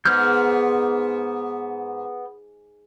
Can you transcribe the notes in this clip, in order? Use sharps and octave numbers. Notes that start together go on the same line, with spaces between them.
G#2 B3 F6 G6